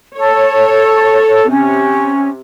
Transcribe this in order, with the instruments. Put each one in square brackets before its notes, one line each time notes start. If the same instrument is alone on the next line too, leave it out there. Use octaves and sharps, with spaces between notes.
[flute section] A4 [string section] C#5
[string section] C3 [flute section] C#4